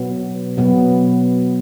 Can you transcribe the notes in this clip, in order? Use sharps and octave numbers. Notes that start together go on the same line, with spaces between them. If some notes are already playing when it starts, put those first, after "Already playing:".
Already playing: B2 F#3 B3
B2 F#3 B3